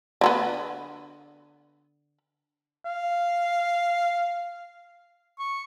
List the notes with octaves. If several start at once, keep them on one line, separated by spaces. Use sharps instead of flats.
D3 F#3 B3
F5
C#6